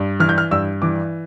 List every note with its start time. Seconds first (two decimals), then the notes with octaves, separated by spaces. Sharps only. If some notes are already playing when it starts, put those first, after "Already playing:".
Already playing: G2
0.20 E3 F6
0.29 G6
0.38 F6
0.51 G2 E6
0.82 E3 D6